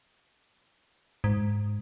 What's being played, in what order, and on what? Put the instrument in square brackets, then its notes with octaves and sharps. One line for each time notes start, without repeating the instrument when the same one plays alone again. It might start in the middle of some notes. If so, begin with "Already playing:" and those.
[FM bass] G#2